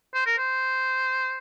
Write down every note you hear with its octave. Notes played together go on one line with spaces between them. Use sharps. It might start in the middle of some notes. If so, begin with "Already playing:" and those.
C5
A#4
C5